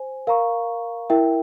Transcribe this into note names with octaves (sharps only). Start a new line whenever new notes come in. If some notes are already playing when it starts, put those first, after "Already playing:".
Already playing: C5 G#5
A#4 F5 A#5 C#6
E4 A#4 E5 G5